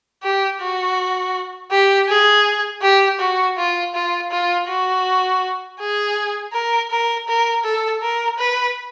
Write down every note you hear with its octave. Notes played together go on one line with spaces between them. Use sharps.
G4
F#4
G4
G#4
G4
F#4
F4
F4
F4
F#4
G#4
A#4
A#4
A#4
A4
A#4
B4